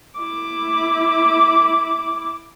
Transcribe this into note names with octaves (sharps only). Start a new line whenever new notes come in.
E4 D6